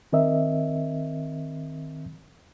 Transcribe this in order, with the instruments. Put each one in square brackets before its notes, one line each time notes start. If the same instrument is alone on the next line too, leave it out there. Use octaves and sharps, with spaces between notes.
[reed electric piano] D#3 C4 A#4 D#5 E5